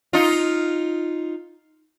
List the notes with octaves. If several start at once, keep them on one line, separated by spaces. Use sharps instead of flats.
D#4 F4